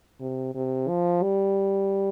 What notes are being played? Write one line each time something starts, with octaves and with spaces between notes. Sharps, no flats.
C3
C3
F3
G3